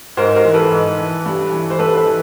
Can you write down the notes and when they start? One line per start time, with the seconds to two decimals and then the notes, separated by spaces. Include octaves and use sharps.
0.17 G#2 A#4 C5
0.36 A#4 C5
0.45 E3
0.54 A4 B4
0.71 G#2
0.98 E3
1.26 G2
1.51 E3
1.70 C5
1.79 G2 A4 B4
1.96 A4 B4
2.06 E3